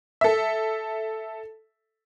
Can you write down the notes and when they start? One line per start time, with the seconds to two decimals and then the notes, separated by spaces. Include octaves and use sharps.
0.21 A4 E5